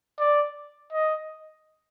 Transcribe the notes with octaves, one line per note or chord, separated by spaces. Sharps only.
D5
D#5